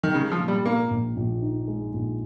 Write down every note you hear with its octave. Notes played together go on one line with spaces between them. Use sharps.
D#3
C#3 G#3
F3
A#2
G3
A#2 A#3
A#1
A#1
D#4
G#3
A#1